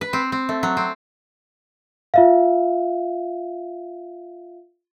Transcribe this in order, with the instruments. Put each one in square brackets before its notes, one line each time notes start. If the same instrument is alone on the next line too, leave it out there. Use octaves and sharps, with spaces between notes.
[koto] B4
C4
C4
A3
F#3
C4
[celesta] F4 E5 F5